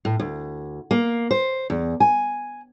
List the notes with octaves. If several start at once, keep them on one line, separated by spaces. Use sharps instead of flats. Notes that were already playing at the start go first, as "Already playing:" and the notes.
A2
D2
A#3
C5
E2
G#5